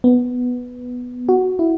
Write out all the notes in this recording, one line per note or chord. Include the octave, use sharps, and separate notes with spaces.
B3
F#4
E4